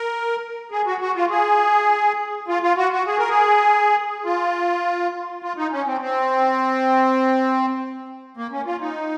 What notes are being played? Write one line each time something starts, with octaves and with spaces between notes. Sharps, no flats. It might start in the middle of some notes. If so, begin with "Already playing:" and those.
Already playing: A#4
G#4
F#4
F#4
F4
G#4
F4
F4
F#4
F#4
G#4
A#4
G#4
F4
F4
D#4
C#4
C4
C4
A#3
C#4
F4
D#4